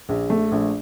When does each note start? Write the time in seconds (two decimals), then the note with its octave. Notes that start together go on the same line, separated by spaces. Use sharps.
0.09 A#1
0.30 A3
0.52 A#1